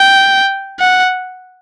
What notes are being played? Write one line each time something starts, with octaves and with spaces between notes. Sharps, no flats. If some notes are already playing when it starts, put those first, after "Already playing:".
Already playing: G5
F#5